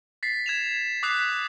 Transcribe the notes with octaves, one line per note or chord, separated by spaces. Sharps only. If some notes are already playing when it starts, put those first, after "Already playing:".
A6 B6 C7
G#6 E7 F7
D6 D#6 F#6 B6 C7 F7